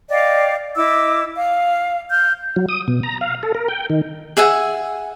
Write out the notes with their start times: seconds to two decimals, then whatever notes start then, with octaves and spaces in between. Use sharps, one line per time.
0.10 D5 D#5 F5 G5
0.76 E4 D#5 D6 E6
1.35 F5
2.10 F6 G6
2.56 F#3
2.69 D#6
2.88 B2
3.03 A#5
3.21 F5
3.43 A4
3.55 A#4
3.68 G5
3.90 D#3
4.37 G#4 E5 F#5 G#5